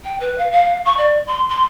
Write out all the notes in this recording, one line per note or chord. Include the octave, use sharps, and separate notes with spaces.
G5
B4
F5
F5
C#6
D5
C6
C6